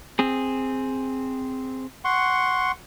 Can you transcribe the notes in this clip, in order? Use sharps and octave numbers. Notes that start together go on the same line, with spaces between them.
C4 G#4
F#5 C6 C#6